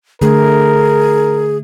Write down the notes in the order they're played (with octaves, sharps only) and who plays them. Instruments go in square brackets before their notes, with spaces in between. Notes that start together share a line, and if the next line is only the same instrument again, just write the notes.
[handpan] D3 A3 [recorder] G#4 [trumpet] A#4